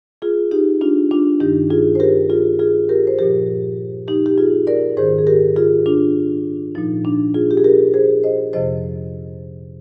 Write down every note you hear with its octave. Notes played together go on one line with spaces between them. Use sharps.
F4 G#4
D#4 G4
D4 F4
D4 F4
G2 D#3 D#4 G4
F4 G#4
C5
G4 A#4
F4 G#4
F4 G#4
G4 A#4
C5
A#2 F3 G4 A#4
D#4 G4
G4
F4 G#4
A#4 D5
G#2 D#3 G#4 C5
G#4
G4 A#4
F4 G#4
D4 F4
A#2 F3 D#4
D4
F4 G#4
G4
G#4
G4 A#4
G#4 C5
C5 D#5
F2 C3 F3 C5 D#5